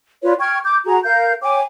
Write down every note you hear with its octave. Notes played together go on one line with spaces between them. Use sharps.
F4 B4 C#5 D5
G5 C#6 F6 G#6
D6 G6
F#4 G#4 A#5
A#4 F5 G6
C#5 G5 G#5 D6